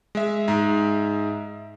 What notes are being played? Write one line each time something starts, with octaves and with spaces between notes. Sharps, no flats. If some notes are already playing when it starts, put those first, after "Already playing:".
G#3 E5
G#2